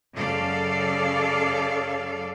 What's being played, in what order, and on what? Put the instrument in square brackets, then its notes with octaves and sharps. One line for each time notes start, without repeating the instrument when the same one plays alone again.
[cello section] F#2 C#3 A4 D5 F5